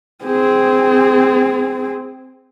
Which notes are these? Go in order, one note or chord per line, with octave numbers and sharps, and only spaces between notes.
C4 G#4